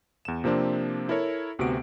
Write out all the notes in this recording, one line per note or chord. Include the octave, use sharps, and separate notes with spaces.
E2 E7
C3 F3 A#3 C4 D4
E4 A4 A#4 C#5
D2 C3 B3 F#4 D7